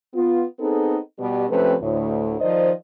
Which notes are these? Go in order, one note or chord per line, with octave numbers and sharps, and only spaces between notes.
B3 F4
B3 C4 D#4 G#4 A4
B2 G3
C3 F3 A3 C4 C#4 B4
D2 A2
D#3 F3 C5 D5 D#5